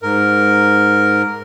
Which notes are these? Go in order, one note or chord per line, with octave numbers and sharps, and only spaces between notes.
G#2 A#4